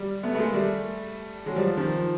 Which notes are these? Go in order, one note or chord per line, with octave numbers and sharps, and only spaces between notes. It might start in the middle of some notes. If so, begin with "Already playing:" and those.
Already playing: G3
A3 B3
A3
G#3 A#3
G3 A3
F#3 G#3
F3 G3
D#3 F3